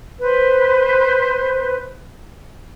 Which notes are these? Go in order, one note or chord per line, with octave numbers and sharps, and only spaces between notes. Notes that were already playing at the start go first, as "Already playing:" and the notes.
B4 C5